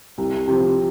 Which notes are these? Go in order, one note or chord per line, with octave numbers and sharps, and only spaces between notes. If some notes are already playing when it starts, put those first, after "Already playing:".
C2
C3 F3